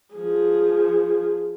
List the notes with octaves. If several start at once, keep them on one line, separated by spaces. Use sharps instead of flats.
F3 G#4